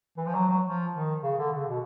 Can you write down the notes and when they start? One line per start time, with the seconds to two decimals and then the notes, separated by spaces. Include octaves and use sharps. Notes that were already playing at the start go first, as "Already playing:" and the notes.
0.17 E3
0.26 F3
0.35 F#3
0.49 F#3
0.65 F3
0.94 D#3
1.23 C#3
1.38 D3
1.53 C#3
1.68 B2